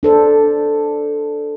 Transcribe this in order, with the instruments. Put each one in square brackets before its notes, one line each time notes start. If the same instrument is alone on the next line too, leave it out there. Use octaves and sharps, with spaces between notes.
[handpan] D4 A4 C5